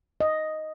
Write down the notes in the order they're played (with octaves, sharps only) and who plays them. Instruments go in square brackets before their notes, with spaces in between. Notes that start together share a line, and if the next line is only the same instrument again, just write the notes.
[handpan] D#5